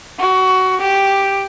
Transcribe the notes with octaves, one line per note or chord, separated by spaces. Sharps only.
F#4
G4